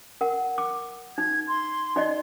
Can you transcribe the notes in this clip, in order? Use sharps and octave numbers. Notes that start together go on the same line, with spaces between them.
A#4 F#5
D6
D#4 G#6
C6
D#4 D5 D#5